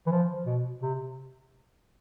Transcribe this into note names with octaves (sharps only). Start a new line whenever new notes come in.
E3
F3
B2
C3